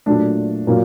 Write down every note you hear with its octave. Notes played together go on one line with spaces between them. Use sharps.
A#2 F#3 A3 D4
A#2 F#3 A#3